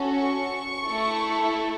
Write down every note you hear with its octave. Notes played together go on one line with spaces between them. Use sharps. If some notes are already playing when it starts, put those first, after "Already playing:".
Already playing: C#4 F#4 A4
C#6
A3 E4 A4